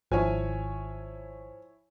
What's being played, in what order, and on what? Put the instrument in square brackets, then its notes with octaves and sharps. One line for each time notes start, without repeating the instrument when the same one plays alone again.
[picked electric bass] G#1 [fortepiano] F3 [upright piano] E4 C#5 G#5